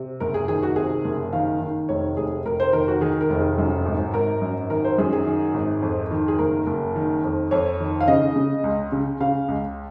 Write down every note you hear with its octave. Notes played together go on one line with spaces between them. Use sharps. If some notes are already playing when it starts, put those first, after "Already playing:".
Already playing: C3
F#1 A#4
G#4
D#3 G#4
F#4
C3 G#4
F#1
D#3 F5
D#3
F1 C#5
F1 G#4
F1 A#4
C5
D#3 A#4
F#4
D#3 G#4
A#4
F1
G#4
F#2
G#1
G#1 A#4
F#2
D#3 A#4
C5
F#2 G#4
G#4
D#3
G#1
F2
D#3
G#4
F#1 A#4
F#1
D#3
F2
F2 C#5
D#3
F5
C#3 D#5
C#3
C#2
C#3
C#3 F5
C#2